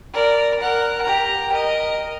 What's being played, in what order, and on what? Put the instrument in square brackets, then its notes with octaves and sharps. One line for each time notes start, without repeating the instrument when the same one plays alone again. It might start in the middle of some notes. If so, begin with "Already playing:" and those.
[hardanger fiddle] A#4 D5
A#4 F#5
G4 A#5
A#4 D#5